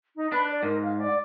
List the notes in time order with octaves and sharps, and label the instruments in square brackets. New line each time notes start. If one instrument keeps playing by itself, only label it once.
[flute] D#4
[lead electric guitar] D4 [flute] B4
[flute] D5
[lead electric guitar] G#2 [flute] A#4
[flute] F5
D5